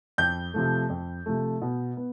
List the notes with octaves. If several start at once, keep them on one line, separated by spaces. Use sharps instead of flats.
F2 G6
C3 F3 A3
F2
C3 F3 A3
B2
B3